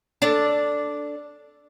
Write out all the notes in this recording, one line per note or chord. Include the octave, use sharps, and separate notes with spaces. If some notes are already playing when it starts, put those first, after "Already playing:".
D4 A4 D5